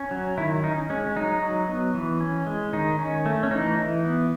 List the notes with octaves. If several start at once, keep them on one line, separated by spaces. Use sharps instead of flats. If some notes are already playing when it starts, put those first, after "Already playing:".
Already playing: C#4
F#3
D#3 E4
C#4 D#4
G#3 C#4
F#3 D#4
F#3
B3
E3
C#4
G#3
D#3 D#4
C#4
A3
C#4
E3 D#4
E3
B3